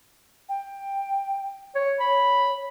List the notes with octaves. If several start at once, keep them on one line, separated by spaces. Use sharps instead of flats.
G5
C#5
C#5 B5